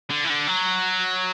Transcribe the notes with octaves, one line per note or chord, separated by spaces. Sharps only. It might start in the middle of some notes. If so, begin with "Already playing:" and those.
D3
E3
D3
F#3